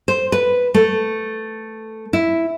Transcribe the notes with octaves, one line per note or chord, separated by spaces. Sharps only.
C5
B4
A3
E4